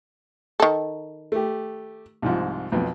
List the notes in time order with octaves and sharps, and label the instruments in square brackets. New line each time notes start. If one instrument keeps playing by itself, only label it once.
[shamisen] D#3 A4
[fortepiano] A3 G4
C2 G#2 F3
B1 F2